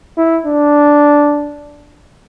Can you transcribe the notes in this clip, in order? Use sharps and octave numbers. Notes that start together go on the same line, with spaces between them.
E4
D4